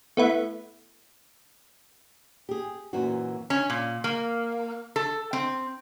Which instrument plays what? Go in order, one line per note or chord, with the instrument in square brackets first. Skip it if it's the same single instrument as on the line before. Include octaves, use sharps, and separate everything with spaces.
[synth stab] A3 B3 E4
[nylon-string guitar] G4 G#4
F#2 A#2 E3 C4 F#4
[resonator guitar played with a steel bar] C#4
A#2
A#3
A4
C4